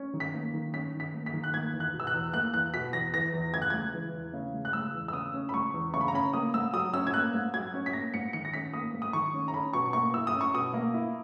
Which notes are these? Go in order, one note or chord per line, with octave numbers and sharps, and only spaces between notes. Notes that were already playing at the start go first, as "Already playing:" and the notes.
Already playing: C#4
D#3
B6
A#3
D#3
C#4 B6
D#3
B6
A#3
B6
D#3
F#6
A#3 G#6
E2
F#6
B2
E6
F#6
E2
A#3 F#6
E2 F#6
B2 B6
E2 A#6
E3 A#6
E2
C#3 G#6
F#6
G#3 G#6
E3
E2
C#3
G#3
F#6
G#3 E6
E2
E6
C#3 D#6
C#4
B5
G#3 C#6
E2
C#3 C#6
B5
A#5
C#4 B5
A#3 D#6
G#2 E6
F#3 D#6
C#4 E6
G#6
A#3 F#6
G#2
F#3 G#6
C#4
B6
A#3 A#6
G#2 C#7
D#3 C#7
A#6
C#4 B6
A#3 D#6
G#2
D#6
D#3 C#6
C#4
A#5
C#4 B5
B2 C#6
A#3 C#6
E4 E6
D#6
C#4
C#6
B2 D#6
A#3
E4